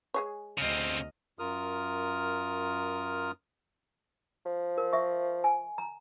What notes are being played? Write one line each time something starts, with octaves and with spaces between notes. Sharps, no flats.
G#3 G#4 C#5
D2 C#3 C4 D#5 F6
F#2 F4 A#4 D#6 F6
F3
A#4
E5 C#6
G#5
A#5